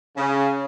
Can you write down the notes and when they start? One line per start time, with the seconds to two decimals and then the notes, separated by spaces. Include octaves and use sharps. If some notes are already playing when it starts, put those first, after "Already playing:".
0.17 C#3